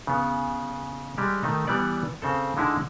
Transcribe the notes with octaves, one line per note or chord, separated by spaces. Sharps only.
C#3 B3
G3 G#3 G4
D#3 A3 D#4
E3 G3 B3 D5
C#3 C4 A4
D3 G#3 D#4 E4